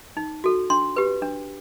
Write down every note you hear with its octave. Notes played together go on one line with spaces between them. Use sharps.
D#4
F#4 A4
D4 C6
G4 B4
D4